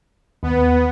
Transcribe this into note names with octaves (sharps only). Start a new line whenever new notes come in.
D#2 B3